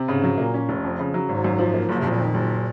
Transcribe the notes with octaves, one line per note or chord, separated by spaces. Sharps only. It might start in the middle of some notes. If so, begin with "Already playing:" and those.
Already playing: C3
G#2 C#3
F#3
A#2 A#3
C#4
F1
F2
C#3
F#3
G#1 G#2
F#2
F3
A#3
F#1 G#2
G#2 C3
F2 A#2
D#3
F#1